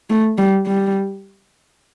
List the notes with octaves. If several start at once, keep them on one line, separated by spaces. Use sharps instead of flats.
A3
G3
G3